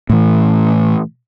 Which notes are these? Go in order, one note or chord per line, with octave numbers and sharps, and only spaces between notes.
A2 E3